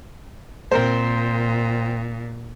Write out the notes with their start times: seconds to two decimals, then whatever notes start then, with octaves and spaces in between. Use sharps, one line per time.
0.72 A#2 C4 A#4 C5